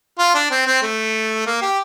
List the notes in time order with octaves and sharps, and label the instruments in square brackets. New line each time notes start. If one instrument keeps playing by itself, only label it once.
[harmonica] F4
D4
C4
C4
A3
A#3
G4